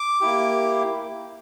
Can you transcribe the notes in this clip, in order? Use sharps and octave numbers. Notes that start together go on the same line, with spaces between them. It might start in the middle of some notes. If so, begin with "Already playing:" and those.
Already playing: D6
A#3 E4 G4